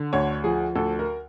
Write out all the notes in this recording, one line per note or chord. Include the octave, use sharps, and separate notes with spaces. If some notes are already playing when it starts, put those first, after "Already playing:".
Already playing: D3
D2 C#5
F3 G#4
D2 A4
A#4